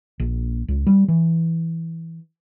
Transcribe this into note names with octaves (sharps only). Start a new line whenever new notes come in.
A#1
C#2
G3
E3